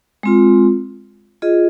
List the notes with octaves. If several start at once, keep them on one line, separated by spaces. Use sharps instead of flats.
G#3 C4 F4
F4 G#4 D#5